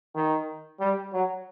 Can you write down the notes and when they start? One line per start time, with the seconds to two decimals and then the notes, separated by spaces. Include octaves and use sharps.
0.15 D#3
0.80 G3
1.13 F#3